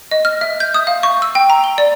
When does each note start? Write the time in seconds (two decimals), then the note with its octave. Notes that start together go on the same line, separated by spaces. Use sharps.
0.11 D#5
0.25 F6
0.41 E5
0.60 G6
0.74 D#6
0.87 F5
1.03 C#6
1.22 E6
1.35 G5
1.50 A#5
1.64 G7
1.78 D5